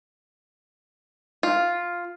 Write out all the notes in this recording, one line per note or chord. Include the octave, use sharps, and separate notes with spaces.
F4